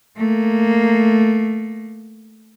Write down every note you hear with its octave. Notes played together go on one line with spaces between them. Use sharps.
A3 A#3